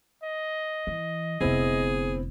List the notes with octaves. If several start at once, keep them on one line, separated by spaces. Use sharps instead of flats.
D#5
E3
F1 D3 B3 C4 E4 G#4